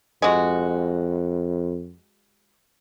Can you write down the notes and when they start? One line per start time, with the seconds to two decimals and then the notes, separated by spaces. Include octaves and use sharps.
0.22 F2 G#3 F#4